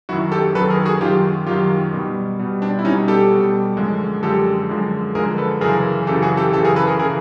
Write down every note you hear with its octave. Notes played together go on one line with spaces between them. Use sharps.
F#2 D#3 F#3 E4 F#4
G4 A4
F#2 D#3 F#3 A4 B4
G#4 A#4
F#4 G#4
F#2 D#3 F#3 F4 G4
F#2 D#3 F#3 F4 G4
B2 G3
B2 G3
C4 D4
E4
B2 G3 C#4 D#4
G4 A4
B2 G3
F#2 D3 F3 G#3
F#2 D3 F3 G#3 G4 A4
F#2 D3 F3 G#3
F#2 D3 F3 G#3 G#4 A#4
A4 B4
F#2 C#3 E3 G#4 A#4
F#2 C#3 E3 G4 A4
F#4 G#4
G4 A4
F#2 C#3 E3 G4 A4
G#4 A#4
A4 B4
G#4 A#4
C#3 E3 G#4 A#4